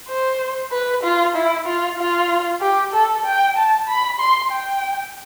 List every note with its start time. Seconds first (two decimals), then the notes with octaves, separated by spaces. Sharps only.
0.09 C5
0.72 B4
1.03 F4
1.35 E4
1.67 F4
1.99 F4
2.62 G4
2.94 A4
3.25 G5
3.57 A5
3.88 B5
4.20 C6
4.52 G5